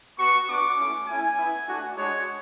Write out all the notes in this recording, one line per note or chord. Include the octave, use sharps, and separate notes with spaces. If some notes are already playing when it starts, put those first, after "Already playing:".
B3 F#4 C#6
B3 D4 F#4 D6
A3 C#4 E4
A3 C#4 E4 G#5
B3 E4
A3 D4 F#4
G#3 D4 F#4 C#5